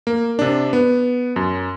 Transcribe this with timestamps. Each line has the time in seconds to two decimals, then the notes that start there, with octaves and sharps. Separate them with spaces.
0.07 A#3
0.39 C3 D4
0.73 B3
1.36 F#2